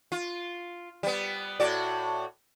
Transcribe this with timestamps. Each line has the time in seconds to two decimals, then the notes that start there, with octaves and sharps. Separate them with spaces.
0.12 F4
1.03 G3 B3
1.60 A2 F#4 D5